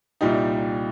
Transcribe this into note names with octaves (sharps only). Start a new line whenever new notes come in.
C2 A#2 G3 D#4 G4